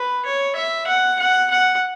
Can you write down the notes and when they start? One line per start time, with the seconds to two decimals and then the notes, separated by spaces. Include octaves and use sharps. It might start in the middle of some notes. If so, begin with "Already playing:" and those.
Already playing: B4
0.25 C#5
0.56 E5
0.87 F#5
1.19 F#5
1.50 F#5